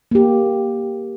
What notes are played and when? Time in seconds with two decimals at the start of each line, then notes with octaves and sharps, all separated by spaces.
0.11 A#3 G4